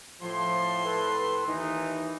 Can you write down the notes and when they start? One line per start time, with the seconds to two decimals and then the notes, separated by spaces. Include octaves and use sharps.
0.22 A2 F3 C6
0.85 A4 B4
1.47 D#2 E3 D#4